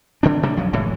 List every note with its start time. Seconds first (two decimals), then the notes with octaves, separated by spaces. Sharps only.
0.23 D3 C4 D4
0.43 C3 G3 A#3 D4
0.56 B1 F#2 F3 F#3
0.73 F#1 A2 E3 G#3